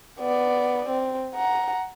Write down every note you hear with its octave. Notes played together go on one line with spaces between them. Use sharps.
B3 D5
C4
F#5 A#5